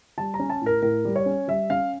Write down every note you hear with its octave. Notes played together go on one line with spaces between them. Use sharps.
G3 A5
A#5
C#4
A5
A2 A#4
A2 A#4
G3
C#5
C#4
G3 E5
C#4 F5